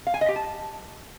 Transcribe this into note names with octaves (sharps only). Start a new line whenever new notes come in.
F5
G#5
D#5
G4
A5